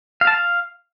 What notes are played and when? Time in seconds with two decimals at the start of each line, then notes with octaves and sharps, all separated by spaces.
0.21 F5
0.27 A5
0.33 F5